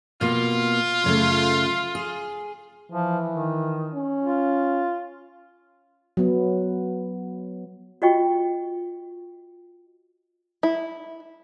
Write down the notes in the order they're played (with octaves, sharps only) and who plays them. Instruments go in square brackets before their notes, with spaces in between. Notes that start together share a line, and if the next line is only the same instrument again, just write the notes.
[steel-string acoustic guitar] B2 A#3 [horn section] F4
[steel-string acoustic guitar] F#2 C#3 A3
G#4
[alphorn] E3 [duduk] F3
[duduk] D#3
[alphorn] C#4
[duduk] F4
[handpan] F#3 B3
[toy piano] F4 F#4 D#5 G5 C#6
[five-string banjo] E4